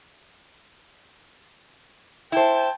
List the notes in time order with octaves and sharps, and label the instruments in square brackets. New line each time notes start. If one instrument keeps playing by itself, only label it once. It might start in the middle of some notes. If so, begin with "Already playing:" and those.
[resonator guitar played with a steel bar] E4 C5 [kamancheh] G5 A5